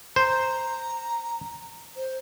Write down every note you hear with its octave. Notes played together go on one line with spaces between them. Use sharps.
C5 A#5
C5